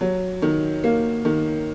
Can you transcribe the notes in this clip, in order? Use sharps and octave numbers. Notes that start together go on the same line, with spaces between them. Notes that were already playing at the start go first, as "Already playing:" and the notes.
F#3
D#3
A#3
D#3